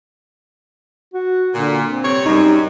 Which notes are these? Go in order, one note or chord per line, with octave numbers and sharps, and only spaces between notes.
F#4
A#2 D3
C4
G2 C3 C#5
F#2 G3 D#4